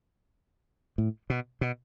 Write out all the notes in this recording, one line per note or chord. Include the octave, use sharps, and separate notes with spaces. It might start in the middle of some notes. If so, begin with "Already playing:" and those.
A2
B2
B2